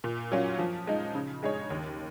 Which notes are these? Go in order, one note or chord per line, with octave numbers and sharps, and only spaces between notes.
A#2
F#3 C#4 F4
F3
G#3 D#4
C#3
G#3 D#4 G#4 C#5
D#2